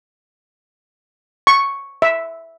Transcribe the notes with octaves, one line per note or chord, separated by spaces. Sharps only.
C#6
E5